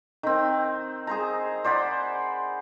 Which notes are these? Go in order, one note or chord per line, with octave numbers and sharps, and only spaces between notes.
D#3 C4
G#4 C5 A#5
C5 D5 F#5 B5